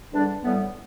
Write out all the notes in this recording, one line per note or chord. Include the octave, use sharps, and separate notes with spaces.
E2 D3 G3 D4
A2 E3 G3 B3